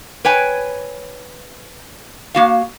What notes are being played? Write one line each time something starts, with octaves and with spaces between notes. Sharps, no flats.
B4 C#5 G5 G#5
A#3 F#4 F5